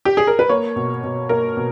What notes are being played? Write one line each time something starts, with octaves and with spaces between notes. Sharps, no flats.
G4
G#4
A#4
B4
A#3 C#5
B2
B2
A#3 A#4
B2